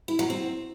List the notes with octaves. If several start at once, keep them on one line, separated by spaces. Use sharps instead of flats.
E4
F#3
C4